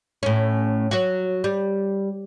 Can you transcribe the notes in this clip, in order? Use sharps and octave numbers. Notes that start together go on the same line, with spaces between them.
A2 C#4
F#3 F#4
G3